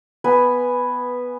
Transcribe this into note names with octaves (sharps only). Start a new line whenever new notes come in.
B3 B4 G#5